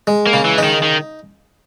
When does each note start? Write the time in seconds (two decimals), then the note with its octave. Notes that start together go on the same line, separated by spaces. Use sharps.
0.07 G#3
0.27 A#3
0.33 C#3
0.45 E3
0.58 D#4
0.64 D#3
0.83 D#3